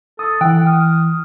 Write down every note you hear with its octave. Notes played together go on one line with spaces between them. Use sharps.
A4 D#6
E3 F#5 G5
D#6 F6